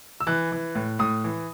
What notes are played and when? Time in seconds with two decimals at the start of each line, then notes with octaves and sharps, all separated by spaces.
0.20 E6
0.27 E3 F#6
0.52 E3
0.75 A2
0.99 A2 D#6
1.24 E3